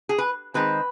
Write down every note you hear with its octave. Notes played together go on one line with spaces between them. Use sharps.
G#4
B4
D#3 G#3 C4 B4